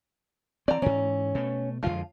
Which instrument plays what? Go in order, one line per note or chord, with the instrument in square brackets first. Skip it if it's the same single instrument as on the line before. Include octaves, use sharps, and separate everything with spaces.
[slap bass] E3 C4 [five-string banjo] D5 A#5
[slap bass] G#2 E3 [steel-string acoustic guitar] C#4
[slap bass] B2 A3
[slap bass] F2 D3 G#3 [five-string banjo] F3 F4